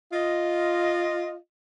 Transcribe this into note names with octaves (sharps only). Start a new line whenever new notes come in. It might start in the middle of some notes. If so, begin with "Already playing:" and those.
F4 D#5